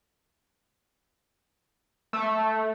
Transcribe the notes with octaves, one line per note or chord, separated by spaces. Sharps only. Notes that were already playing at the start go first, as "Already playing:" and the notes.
A3